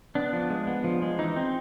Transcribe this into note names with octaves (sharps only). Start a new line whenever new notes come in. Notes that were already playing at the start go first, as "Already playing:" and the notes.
B3 D4
F3
G#3
B3
F3
G#3
E3 D#4
C4